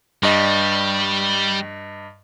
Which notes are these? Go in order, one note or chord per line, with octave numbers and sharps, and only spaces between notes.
G2 G3 D#5